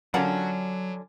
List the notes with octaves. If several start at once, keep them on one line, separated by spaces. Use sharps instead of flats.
D3 F#3 C#4 D4 F4 A#4 F#5